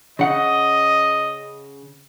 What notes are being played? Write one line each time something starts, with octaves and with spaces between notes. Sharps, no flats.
C#3 D#5 F#5